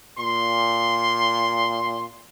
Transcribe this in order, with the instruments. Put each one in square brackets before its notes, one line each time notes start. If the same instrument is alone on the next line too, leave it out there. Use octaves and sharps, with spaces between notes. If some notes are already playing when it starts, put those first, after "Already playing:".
[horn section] A#2 C6